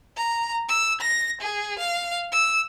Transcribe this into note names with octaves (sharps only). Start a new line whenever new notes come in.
A#5
E6
A#6
G#4
F5
E6